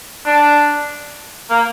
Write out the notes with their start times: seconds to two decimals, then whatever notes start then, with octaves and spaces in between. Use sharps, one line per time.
0.26 D4
1.50 A#3